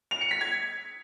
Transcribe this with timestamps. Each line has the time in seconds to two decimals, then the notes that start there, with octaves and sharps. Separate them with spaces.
0.11 F7
0.21 C#7
0.31 B6
0.41 G#6